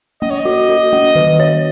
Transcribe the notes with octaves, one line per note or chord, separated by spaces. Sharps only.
A#3 D#5
C#5
D#5
F#4
F#4
A#3
D#3
C#5